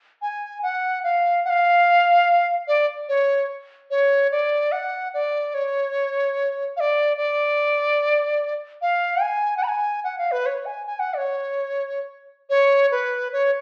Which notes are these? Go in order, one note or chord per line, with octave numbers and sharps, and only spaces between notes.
G#5
F#5
F5
F#5
F5
D5
C#5
C#5
D5
F#5
D5
C#5
F5
D5
D5
F5
G#5
F#5
B5
G#5
F#5
F5
B4
C#5
G#5
G#5
F#5
D5
C#5
C#5
B4
C#5